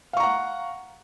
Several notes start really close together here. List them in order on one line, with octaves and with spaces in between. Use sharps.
F5 C#6 A#5 F#5